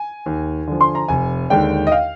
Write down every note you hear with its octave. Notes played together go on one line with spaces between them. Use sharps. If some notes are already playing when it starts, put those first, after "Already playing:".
Already playing: G#5
D#2
D3 F3
C6
A#5
F1 G#5
D#2 D3 G#3 D4 G5
D#5
F5